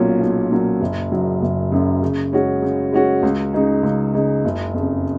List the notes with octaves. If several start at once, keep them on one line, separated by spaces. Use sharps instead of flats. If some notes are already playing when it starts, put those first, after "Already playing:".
Already playing: B1 A#2 F#3 C#4 F4
B1
A#2 F#3 C#4 F4
F#1
F#2 C#3 F#3
F#1
F#2 C#3 F#3
C#3
G#3 C#4 F#4
C#3
G#3 C#4 F#4
C#2
C#3 G#3 D#4 G#4
C#2
C#3 G#3 D#4 G#4
F#1
F2 C#3